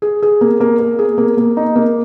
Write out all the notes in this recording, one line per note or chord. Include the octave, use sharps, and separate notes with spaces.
G#4
G#4
A#3
A#3
A#3
G#4
A#3
A#3
D#4
A#3